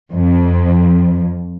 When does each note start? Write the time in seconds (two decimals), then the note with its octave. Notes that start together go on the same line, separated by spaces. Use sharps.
0.12 F2